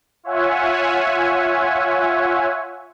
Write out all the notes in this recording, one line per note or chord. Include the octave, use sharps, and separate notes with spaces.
F4 C#5 E5 F#5 G#5